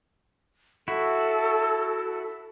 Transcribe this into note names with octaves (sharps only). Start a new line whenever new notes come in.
E4 F#4 A4